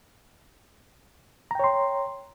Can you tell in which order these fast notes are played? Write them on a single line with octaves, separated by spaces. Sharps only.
A#5 G5 C#5 C6